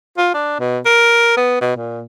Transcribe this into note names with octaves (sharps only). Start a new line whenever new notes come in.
F4
D4
B2
A#4
B3
B2
A#2